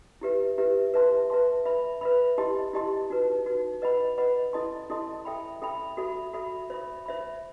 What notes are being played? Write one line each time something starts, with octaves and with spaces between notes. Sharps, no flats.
E4 G4 B4 E5
E4 G4 B4 E5
B4 E5 A5 C6
B4 E5 A5 C6
B4 E5 B5
B4 E5 B5
E4 G4 D#5 A5 C6
E4 G4 D#5 A5 C6
D#4 F#4 B4
D#4 F#4 B4
B4 D#5 F#5 B5
B4 D#5 F#5 B5
E4 A4 D#5 A5 C6
E4 A4 D#5 A5 C6
A4 E5 G5 B5
A4 E5 G5 B5
F#4 A4 E5 B5
F#4 A4 E5 B5
C5 E5 B5
C5 E5 B5